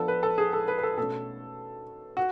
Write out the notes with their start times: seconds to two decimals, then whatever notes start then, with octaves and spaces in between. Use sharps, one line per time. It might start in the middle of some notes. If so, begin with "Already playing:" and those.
Already playing: F3 B3 D4 A4
0.08 B4
0.23 A4
0.38 G#4
0.53 A4
0.68 B4
0.79 B4
0.83 A4
0.97 B2 A3 C#4 A4
2.17 F#4